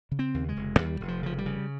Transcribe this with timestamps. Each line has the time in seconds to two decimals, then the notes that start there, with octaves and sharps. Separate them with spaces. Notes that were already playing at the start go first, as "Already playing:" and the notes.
0.12 C#3
0.19 C4
0.34 D#2
0.49 G#3
0.57 F1
0.79 D#2 G3
1.01 F1
1.08 F3
1.23 C#3 F3
1.38 G3
1.46 C#3